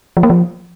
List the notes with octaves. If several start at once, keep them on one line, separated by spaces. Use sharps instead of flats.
F3
A#3
F3